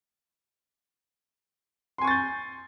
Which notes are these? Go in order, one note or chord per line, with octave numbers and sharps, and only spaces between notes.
G#5 C6 C#6 G6 A6